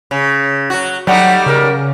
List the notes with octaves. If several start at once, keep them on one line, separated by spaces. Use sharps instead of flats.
C#3
F#3 F#4
F#3 G3 A3 D#4 F#5
C#3 A#4